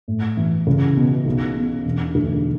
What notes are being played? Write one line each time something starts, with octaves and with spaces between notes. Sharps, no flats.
A2
E3
C#2
B2
B1
B2
E1
D2